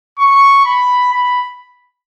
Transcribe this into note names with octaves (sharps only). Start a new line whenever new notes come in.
C#6
B5
B5